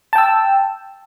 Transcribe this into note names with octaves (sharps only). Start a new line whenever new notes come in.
G5 A5 E6